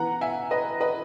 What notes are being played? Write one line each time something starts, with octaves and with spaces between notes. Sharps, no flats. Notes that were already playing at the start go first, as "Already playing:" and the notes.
Already playing: E3 B3 F#5 A#5
E5 G#5
B4 D#5
B4 D#5